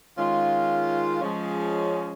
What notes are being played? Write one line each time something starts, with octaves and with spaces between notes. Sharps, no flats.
D#3 G#3 C#4 F4
F3 G#3 C#4